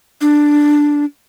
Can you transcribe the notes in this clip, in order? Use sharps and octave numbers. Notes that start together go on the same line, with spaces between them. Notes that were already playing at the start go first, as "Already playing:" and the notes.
D4